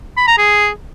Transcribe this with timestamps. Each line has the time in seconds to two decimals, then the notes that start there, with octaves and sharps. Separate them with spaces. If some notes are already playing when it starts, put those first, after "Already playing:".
0.17 B5
0.28 A#5
0.38 G#4